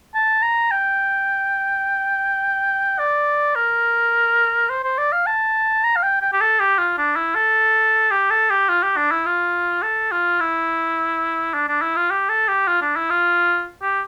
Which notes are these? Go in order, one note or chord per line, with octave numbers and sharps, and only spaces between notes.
A5
A#5
G5
D5
A#4
C5
C5
D5
F5
A5
A#5
F5
G5
G5
G4
A4
G4
F4
D4
E4
A4
G4
A4
G4
F4
G4
D4
E4
F4
A4
F4
E4
D4
D4
E4
F4
G4
A4
G4
F4
D4
E4
F4
G4